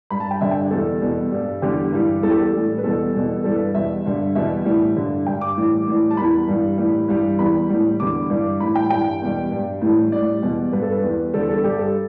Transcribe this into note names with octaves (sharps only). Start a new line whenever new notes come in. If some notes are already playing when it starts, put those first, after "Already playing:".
G2 G3 B5
A5
G5
G2 D3 G3 E5
G5
D5
E2 B2 G3 A4
E2 B2 G3
G2 G3
E2 D3 G3 G4
G2 E3 G3
E2 E3 G3 A4
G4
A4
A2 E3 G3
B4
E2 B2 G3 A4
E2 B2 G3
G2 E3 G3 A4
B4
E2 B2 G3 E5
G2 D3 G3
E2 B2 G3 E5
A2 E3 G3
G2 D3 G3
G2 G3 G5
D6
A2 E3 G3
A2 E3 G3
A5
E2 E3 G3 B5
G2 E3 G3
A2 E3 G3
G2 E3 G3
E2 E3 G3 B5
A2 E3 G3
E2 D3 G3 D6
G2 E3 G3
A2 E3 G3 B5
G5
G2 E3 G3 G5
E2 B2 G3
G2 G3
A2 E3 G3
A2 G3 D5
E2 B2 G3
G2 G3 B4
A4
B4
E2 E3 G3
E2 D3 G3 A4
A4
G2 G3 G4
A4